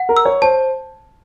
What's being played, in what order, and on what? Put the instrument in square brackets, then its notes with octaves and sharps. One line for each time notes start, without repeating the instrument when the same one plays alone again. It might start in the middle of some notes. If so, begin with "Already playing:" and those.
Already playing: [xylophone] F#5
[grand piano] A#4
[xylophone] E6
[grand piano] C#5
[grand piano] C5 [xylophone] A5